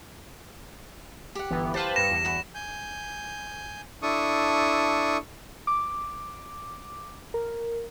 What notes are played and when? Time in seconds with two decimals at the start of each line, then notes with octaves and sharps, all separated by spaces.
1.35 G4 F#5
1.51 G1 E3 B3
1.74 G4 B4 C5 F5 A5
1.96 G2 A#6 C#7 E7
2.11 E2
2.25 F#4 B5
2.55 G#5 G6
4.02 D4 E4 A4 C#6 D#6
5.67 D6
7.34 A#4